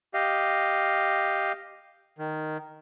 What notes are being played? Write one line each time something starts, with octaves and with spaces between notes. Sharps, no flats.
G4 D#5 F5
D#3